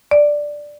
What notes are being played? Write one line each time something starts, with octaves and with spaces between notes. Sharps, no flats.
D5